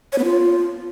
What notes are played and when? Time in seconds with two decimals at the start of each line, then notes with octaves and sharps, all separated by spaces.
0.13 C#5
0.18 B3
0.24 F4